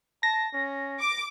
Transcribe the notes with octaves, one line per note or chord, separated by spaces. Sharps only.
A5 A#6
C#4
D6